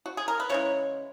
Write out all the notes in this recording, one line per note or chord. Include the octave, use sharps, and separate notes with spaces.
F#4
G#4
A#4
B4
C#3 E3 G#3 C#5